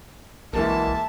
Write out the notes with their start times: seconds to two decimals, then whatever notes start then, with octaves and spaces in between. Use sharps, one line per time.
0.53 B1 E3 G#3 A#3 E5 A5